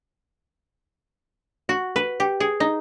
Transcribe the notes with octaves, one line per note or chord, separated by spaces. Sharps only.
F#4
B4
G4
G#4
D#4